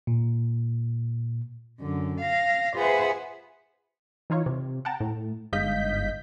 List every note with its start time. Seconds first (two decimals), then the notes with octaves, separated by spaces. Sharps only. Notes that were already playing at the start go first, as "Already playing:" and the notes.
0.07 A#2
1.80 F#2 D3
2.21 F5 A#6
2.74 F4 G#4 B4 C5 E5 F#5
4.30 E3 D#4 F4 C#5
4.46 C3
4.85 F#5 G5 A5 A#5
5.00 A2
5.53 G1 G#2 D#5 F5 G6 B6